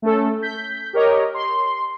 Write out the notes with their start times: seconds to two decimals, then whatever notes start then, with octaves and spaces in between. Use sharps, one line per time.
0.02 A3 C#4 A4
0.42 G6 B6
0.93 G4 A#4 C#5 D#5
1.34 C6